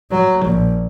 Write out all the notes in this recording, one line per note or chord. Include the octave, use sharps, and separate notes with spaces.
F#3
A#1